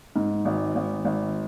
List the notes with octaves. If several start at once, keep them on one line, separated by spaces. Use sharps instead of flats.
G#2
G#1
G#1
G#1